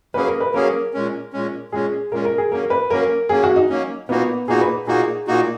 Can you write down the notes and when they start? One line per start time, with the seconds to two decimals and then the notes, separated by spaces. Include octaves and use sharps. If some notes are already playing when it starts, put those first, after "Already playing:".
0.14 F#3 A#3 C#4 G#4 B4
0.28 A#4
0.40 B4
0.54 F#3 A#3 C#4 G#4 A#4
0.94 A#2 G#3 C#4
1.33 A#2 G#3 C#4
1.72 A#2 G#3 C#4 G#4
2.12 A#2 G#3 C#4 A#4
2.25 A#4
2.38 G#4
2.51 F#3 A#3 C#4 A#4
2.70 B4
2.90 F#3 A#3 C#4 A#4
3.29 F#3 A#3 C#4 G#4
3.44 F#4
3.56 D#4
3.69 F#3 A#3 C#4
4.09 A#2 A#3 B3 D#4 F#4
4.48 A#2 A#3 D#4 F#4 G#4
4.61 B4
4.87 A#2 A#3 D#4 F#4 G#4
5.27 A#2 A#3 D#4 F#4